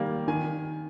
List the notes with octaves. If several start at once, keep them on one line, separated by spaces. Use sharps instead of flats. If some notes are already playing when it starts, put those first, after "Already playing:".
Already playing: D#3 G3 A#3
D#3 G#5